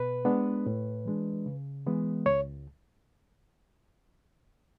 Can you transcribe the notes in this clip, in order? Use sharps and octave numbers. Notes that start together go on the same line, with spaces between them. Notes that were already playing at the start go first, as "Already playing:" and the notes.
Already playing: B2 B4
G#3 B3 D4
A2
E3 G#3 D4
C#3
E3 G#3 B3
C#2 C#5